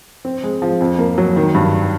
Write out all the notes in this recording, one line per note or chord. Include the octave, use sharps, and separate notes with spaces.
C4
G#3
F3
F2
A#3
F#3
D#3
G2